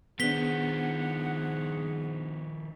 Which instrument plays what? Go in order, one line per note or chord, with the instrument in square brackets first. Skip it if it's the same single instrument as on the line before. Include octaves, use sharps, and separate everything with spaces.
[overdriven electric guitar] D#3 F3 [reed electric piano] B3 D4 [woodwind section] G#4 F#5 [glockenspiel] B6 G7